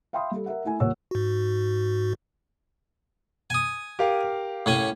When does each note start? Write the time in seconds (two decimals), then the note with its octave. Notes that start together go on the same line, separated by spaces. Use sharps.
0.13 E5 F5 G5 B5 C6 D#6
0.31 G3 A4
0.46 A#4 E5 F#5
0.64 A3 E4 G#5
0.80 D#1 A#2 A#4 C#5 F#5 E6
1.11 G#2 F#4
3.50 G#5 D#6
3.99 G4 A#4 F5
4.66 A2 C#4 G#5